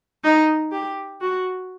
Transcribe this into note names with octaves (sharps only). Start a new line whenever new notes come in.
D#4
G4
F#4